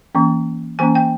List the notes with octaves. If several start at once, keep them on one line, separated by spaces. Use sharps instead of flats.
E3 A#3 C#4
E3 A#3 C#4 G#5
G5